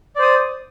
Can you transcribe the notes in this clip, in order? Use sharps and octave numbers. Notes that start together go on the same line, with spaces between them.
C5 D5 D#6